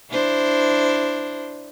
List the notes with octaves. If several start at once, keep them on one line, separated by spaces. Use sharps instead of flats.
D4 E4 C5